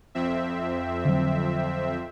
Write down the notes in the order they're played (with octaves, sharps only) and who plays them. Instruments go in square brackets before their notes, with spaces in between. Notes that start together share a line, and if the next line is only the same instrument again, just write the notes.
[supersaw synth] F2 C4 E5
[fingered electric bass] D3 F#3